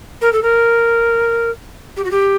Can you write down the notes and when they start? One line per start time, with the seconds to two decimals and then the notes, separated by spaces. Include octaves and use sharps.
0.21 A#4
0.32 A4
0.42 A#4
1.96 G4
2.04 F#4
2.11 G4